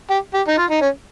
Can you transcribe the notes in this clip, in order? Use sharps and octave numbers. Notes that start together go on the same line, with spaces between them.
G4
G4
D#4
F4
D#4
C#4